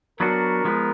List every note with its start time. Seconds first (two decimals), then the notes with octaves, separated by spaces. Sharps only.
0.20 F#3 B3 D4 F#4 A#4
0.65 F3 G#3 B3